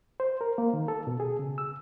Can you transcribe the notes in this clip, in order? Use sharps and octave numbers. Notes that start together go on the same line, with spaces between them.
C5
A#4
A#3
D#3
A4
B2
G#4
C#3
E6